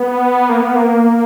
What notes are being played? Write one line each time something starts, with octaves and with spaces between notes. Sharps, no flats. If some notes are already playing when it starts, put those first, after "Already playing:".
Already playing: B3
A#3
B3
A#3